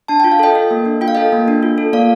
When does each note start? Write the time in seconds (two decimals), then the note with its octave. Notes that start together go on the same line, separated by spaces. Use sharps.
0.08 D4 A5
0.20 F4 G5
0.32 F5
0.39 A4 D#5 G5
0.55 A4
0.71 A#3
0.86 D4
1.01 F4 G5
1.08 F5
1.15 A4 D#5 G5
1.32 A#3
1.48 D4
1.63 F4
1.78 A4
1.93 A#3 D5 F5